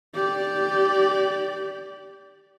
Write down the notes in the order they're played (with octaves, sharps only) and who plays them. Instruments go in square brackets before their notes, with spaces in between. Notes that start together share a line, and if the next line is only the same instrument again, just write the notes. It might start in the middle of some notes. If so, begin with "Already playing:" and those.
[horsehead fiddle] G4 D5